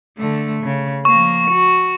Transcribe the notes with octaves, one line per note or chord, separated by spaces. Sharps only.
D3 A3
C#3
F3 A#3 C#6
F#4